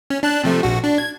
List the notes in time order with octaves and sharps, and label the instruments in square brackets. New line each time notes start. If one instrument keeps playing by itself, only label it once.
[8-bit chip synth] C#4
D4 A5 F#6
C3 F3 A3
A#1 F#4
D4
G#6